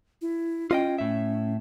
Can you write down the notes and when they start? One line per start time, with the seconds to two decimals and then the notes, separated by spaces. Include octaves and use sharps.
0.22 E4
0.71 C#4 F4 D#5 G5
0.98 A2 E5